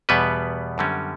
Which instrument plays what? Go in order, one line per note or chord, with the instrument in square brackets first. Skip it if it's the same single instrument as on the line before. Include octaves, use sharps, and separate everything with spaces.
[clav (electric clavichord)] E2 B2 G3 B3 B4
F#2 D3 G3 C#4